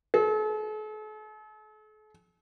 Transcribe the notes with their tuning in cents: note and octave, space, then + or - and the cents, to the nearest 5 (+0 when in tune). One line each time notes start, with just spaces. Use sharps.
A4 -45